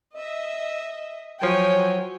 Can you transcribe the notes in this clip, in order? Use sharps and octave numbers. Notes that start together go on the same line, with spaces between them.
D#5 E5
F3 F#3 C#5 G5 G#5